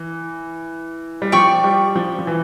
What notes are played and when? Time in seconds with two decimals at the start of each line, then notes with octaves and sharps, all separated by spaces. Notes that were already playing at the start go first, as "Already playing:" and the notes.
Already playing: E3
1.22 G3
1.32 F3 D5 G5 C#6
1.64 G3
1.95 F3
2.19 F3
2.27 E3